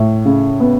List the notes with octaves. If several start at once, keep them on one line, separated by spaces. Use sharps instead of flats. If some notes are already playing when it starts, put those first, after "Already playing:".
Already playing: A2
C#3
B3